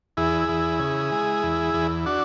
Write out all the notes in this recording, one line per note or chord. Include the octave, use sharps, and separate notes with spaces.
E2 E4 G#4
E2
C#3
G#3
E2
E2
D4 F#4